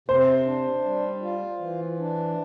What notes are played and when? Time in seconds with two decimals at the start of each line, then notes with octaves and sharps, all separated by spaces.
0.08 C3 C5
0.46 D4
0.84 G3
1.22 F4
1.60 E3
1.99 D4